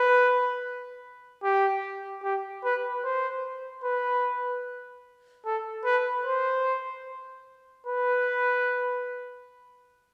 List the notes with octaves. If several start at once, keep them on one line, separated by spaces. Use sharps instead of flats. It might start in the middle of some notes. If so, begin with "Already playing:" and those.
Already playing: B4
G4
G4
B4
C5
B4
A4
B4
C5
B4